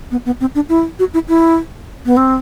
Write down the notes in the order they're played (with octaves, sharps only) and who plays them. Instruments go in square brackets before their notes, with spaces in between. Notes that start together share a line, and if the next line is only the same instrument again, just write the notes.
[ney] B3
B3
C4
D4
E4
F#4
E4
E4
B3
C4